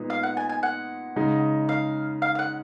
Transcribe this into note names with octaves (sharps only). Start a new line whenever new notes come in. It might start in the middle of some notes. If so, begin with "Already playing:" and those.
Already playing: A#2 G#3 B3 D#4
F5
F#5
G#5
G#5
F#5
C#3 G#3 D#4
F5
F5
F5
F#5